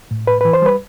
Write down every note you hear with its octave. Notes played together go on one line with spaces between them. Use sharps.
A2
A2 B4
E3 B4
C5
G3 B4